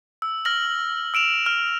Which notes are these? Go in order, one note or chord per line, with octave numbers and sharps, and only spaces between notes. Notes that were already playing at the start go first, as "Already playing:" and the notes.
E6
F6 A#6 F#7
E6 D7 E7 F7
F6